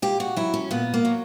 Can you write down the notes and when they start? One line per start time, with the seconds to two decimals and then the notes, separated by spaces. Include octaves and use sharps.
0.02 A#2 G4
0.20 F#4
0.37 F#3 E4
0.54 C#4
0.71 A#2 B3
0.94 A#3
1.05 F#3